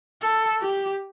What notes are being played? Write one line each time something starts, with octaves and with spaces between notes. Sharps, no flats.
A4
G4